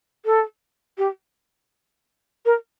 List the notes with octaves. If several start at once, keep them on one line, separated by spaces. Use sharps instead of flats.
A4
G4
A#4